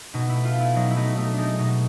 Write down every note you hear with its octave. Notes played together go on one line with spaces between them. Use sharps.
B2 D#4
E4
A3
F4
A3
E4
F#3 D#4
E4
A3 D#4
A3 D#4
D4
G#3 D#4
B2 D#4